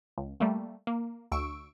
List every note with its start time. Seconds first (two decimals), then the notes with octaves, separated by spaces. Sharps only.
0.18 C#2
0.40 G3 A3 A#3
0.87 A#3
1.32 D2 C#6 E6 D7